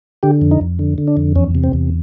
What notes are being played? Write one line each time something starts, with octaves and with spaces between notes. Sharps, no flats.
D3 G4
F2
D#4
F2
D3
D3
D4
F2
E2 C#4
C3
C4
E2